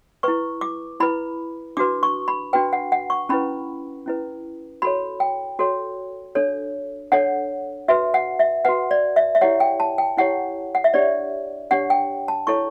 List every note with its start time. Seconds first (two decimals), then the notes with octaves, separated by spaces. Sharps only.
0.23 E4 B4 C#6
0.61 D6
1.00 E4 B4 B5
1.77 D4 F#4 B4 D6
2.03 C#6
2.28 B5
2.53 D4 F#4 B4 G5
2.73 F#5
2.92 F#5
3.10 C#6
3.29 C#4 E4 B4 B5
4.06 C#4 E4 B4
4.82 F#4 A4 C#5 B5
5.20 G5
5.59 F#4 A4 C#5
6.35 D4 A4 C#5
7.12 D4 A4 C#5 F#5
7.88 F#4 B4 E5
8.14 F#5
8.39 E5
8.65 F#4 B4 F#5
8.91 D5
9.16 E5
9.35 E5
9.41 E4 G4 C#5 F#5
9.60 G5
9.80 A5
9.98 G5
10.17 E4 G4 C#5 F#5
10.75 F#5
10.84 E5
10.94 D4 G4 C#5 D5
11.71 D4 G4 C#5 F#5
11.90 G5
12.28 A5
12.47 E4 A4 C#5 C#6